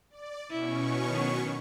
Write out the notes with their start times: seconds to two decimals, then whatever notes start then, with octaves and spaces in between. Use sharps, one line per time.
0.10 D5
0.51 B2 C#4 E4 C#6
1.07 D#3 F#3